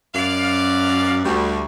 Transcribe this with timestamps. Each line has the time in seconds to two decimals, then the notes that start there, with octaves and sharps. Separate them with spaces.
0.15 F#2 D5 F5
1.25 D2 G3